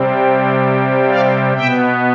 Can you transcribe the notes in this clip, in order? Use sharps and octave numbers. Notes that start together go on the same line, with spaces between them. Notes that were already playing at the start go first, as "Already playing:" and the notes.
Already playing: C3 G3 C4
D5 F5
B2 B3 E5 G5